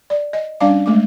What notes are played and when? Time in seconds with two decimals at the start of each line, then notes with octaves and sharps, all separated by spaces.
0.10 D5
0.33 D#5
0.60 G3 C#4 D4 D5 F5 D6
0.86 G#3 A3 D6